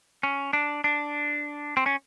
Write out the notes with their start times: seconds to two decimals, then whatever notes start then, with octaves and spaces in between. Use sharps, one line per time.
0.23 C#4
0.53 D4
0.84 D4
1.77 C4
1.86 C#4